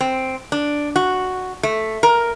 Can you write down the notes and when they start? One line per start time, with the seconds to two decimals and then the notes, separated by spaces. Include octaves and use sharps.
0.01 C4
0.52 D4
0.96 F#4
1.63 A3
2.03 A#4